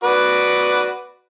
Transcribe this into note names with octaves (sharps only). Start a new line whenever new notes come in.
F#4 B4 D5